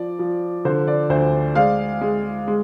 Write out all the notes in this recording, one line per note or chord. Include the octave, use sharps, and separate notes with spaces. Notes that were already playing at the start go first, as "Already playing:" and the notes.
Already playing: F3 D5
F3
D3 C5
D5
D2 C5
G#3 D5 F5
G#3
G#3